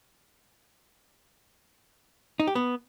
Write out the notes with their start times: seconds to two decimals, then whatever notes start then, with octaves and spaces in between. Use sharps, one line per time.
2.40 D#4
2.47 G4
2.55 B3